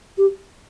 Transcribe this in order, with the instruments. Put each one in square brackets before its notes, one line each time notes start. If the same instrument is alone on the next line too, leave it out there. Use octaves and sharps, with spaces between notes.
[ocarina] G4